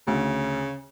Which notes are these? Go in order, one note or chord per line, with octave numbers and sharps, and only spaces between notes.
D2 C#3